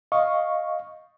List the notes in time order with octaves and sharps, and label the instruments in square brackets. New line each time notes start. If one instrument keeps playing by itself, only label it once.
[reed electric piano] D#5 F5 C#6